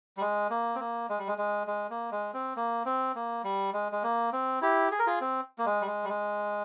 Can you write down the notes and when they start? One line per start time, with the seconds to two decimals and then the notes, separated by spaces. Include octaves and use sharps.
0.17 G3
0.21 G#3
0.50 A#3
0.75 C4
0.80 A#3
1.09 G#3
1.18 G3
1.28 G#3
1.38 G#3
1.67 G#3
1.90 A#3
2.11 G#3
2.34 C4
2.56 A#3
2.85 C4
3.15 A#3
3.44 G3
3.73 G#3
3.92 G#3
4.03 A#3
4.33 C4
4.61 E4 G4
4.91 G#4
4.99 A#4
5.07 F4 G#4
5.21 C4
5.58 A#3
5.66 G#3
5.81 G3
5.87 G#3
6.04 G3
6.09 G#3